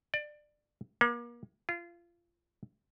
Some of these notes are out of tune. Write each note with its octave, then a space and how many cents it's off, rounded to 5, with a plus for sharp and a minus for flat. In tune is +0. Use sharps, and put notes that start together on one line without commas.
D5 +20
A#3 +35
F4 -25